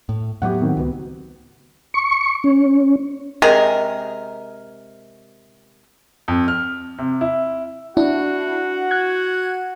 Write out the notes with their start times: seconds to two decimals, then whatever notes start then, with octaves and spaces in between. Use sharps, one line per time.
0.09 A2
0.42 A2 F#3 B3 G4 E5 F#5
0.61 D#3 C4
0.77 C#2 B3 F#4
1.94 C#6
2.44 C#4
3.42 C3 G#3 G#4 A#4
6.28 F2
6.48 F6
6.98 C3
7.21 E4
7.97 D4 E4 F#4
8.91 F#6 G#6